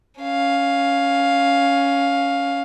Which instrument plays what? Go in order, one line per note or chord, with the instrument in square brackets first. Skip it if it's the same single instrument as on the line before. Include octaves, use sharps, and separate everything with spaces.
[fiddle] C#4 F5